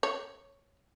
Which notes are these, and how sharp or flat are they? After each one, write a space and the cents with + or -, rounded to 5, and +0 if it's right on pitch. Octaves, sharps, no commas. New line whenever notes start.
C#5 +0